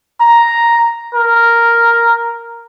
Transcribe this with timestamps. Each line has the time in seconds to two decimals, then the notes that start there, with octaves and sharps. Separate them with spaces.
0.21 A#5
1.14 A#4